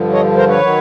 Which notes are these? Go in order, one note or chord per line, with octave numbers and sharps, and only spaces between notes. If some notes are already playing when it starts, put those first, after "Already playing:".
Already playing: G2 D3 F3
C#5 D#5
A#4 C5
B4 C#5
D#3 F#3